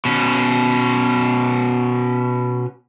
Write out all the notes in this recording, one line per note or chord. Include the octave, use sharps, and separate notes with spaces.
B2 C#4